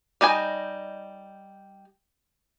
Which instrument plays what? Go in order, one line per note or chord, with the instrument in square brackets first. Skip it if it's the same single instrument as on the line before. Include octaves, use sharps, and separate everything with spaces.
[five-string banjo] G3 D#4 D#5 G#5